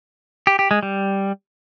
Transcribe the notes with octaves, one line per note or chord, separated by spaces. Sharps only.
G4
G4
G#3
G3